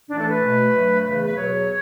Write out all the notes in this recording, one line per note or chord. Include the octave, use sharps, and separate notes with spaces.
A2 E3 A3 D4
A4
B4
B2 A3
G2 F#3 A3
E2 C#3 E3 A3 B4
B4
E2 B2 F#3 C#5